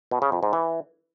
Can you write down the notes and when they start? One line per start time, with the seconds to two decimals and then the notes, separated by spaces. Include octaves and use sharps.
0.11 B2
0.22 C#3
0.32 F2
0.43 G#2
0.53 E3